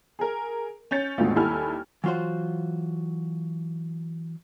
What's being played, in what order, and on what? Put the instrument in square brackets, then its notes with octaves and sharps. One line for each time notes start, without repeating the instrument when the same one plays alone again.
[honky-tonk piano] G#4 A#4
C#4 G6 A6 C#7
G#1 D2 B2 A3 F4
D#2 G3 E4 A4 G#5 F6
[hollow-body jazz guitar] E3 F#3 F4 F#4 C5